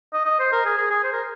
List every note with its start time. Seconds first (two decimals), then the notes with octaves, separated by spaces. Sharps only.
0.13 D#5
0.26 D#5
0.39 C5
0.52 A#4
0.65 G#4
0.77 G#4
0.91 G#4
1.04 C5
1.13 A#4